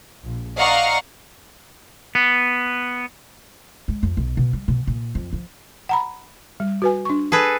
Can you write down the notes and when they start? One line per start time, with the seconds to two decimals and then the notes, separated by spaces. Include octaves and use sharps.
0.23 A#1
0.57 D5 D#5 F5 F#5 A#5 C#6
2.15 B3
3.88 G#3
4.03 F2
4.17 B1
4.37 B2
4.53 G3
4.68 B2
4.87 A#2
5.15 F2
5.33 F3
5.89 F#5 A#5 B5
6.60 G3
6.82 F#4 B4 G#5
7.05 D4 C#6
7.32 G#4 A4 B4